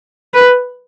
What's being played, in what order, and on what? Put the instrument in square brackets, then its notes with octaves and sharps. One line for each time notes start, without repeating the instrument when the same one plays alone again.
[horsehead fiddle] B4